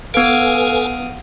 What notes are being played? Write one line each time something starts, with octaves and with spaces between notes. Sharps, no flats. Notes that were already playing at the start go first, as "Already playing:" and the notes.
B3 A4 B4 F5 G#5 D#6 D7